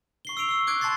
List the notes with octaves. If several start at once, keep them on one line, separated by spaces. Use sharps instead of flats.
C#6 C7 G7
E6 C7 D7 F7
C#6 E6
D6 F#6 G#6 D7
A5 C6 C#6 A6 C7